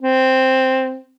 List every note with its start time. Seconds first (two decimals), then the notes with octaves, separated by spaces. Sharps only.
0.02 C4